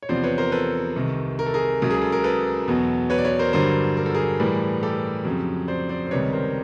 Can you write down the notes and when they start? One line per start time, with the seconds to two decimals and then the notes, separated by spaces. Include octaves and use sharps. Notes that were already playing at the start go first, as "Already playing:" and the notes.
0.02 C#5
0.09 E2 C3 F3 C5 D5
0.24 B4 C#5
0.38 A#4 C5
0.52 A4 B4
0.96 C2 C3 D#3
1.39 A#4
1.46 A4
1.54 G#4 A#4
1.82 C#2 C#3 F#3
1.90 G#4
2.02 A4
2.12 A#4
2.24 A4 B4
2.68 E2 B2 F#3
3.10 B4 C#5
3.18 D5
3.25 B4 C#5
3.39 A#4 C5
3.53 G2 D3 F#3 A#4 C5
3.97 A#4
4.06 A4
4.14 G#4 A#4
4.40 A2 E3 G3
4.83 G4 A4
5.25 F2 C#3 F#3
5.68 C5 D5
5.89 C5 D5
6.07 C5
6.11 C#2 C3 D#3 G3 B4 C#5
6.32 A#4 C5